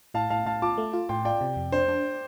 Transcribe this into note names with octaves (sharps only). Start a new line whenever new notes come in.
A2 F5 A5
A2 F5 A5
A2 F5 A5
F4 A5 D6
A3
F4
A2 G5 C6
F4 D5 G5
C3
F2
D4 C5
D4